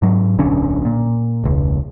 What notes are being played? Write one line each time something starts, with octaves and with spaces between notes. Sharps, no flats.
G#2 F#3
D1 B1 D3 C#4
A#2
E1 C#2